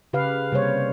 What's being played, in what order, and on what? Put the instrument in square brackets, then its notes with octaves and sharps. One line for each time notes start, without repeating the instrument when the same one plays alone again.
[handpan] C#3 G4 B4 F5
C3 G3 A#3 C5 C#5